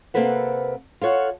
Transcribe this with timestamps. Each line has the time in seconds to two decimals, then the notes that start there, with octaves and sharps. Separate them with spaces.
0.14 C3 A#3 C4 A4 B4 F#5
1.01 F4 A4 C#5 F#5